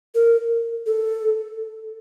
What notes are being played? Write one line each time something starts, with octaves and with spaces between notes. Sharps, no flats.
A#4
A4